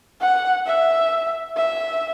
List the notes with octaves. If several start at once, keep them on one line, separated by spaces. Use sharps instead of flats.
F#5
E5
E5